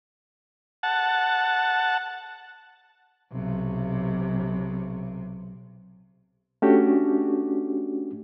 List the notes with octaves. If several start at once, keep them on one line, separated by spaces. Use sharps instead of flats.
F#5 A5
B1 C3
A3 C#4 D4 F#4 G4